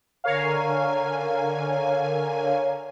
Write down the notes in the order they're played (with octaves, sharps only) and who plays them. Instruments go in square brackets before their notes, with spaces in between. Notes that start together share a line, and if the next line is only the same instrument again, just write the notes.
[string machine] D3 G#5 [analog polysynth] A#4 C#5 F5